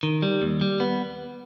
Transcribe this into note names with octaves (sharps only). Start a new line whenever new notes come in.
D#3
G3
D#2
G3
B3